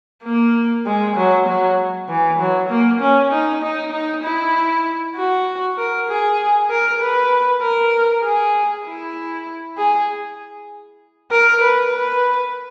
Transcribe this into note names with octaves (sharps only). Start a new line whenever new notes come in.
A#3
G#3
F#3
F#3
E3
F#3
A#3
C#4
D#4
D#4
D#4
E4
F#4
A#4
G#4
A#4
B4
A#4
G#4
E4
G#4
A#4
B4
B4